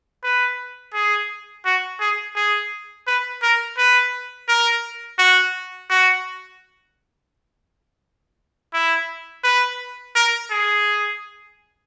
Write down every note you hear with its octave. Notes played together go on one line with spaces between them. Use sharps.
B4
G#4
F#4
G#4
G#4
B4
A#4
B4
A#4
F#4
F#4
E4
B4
A#4
G#4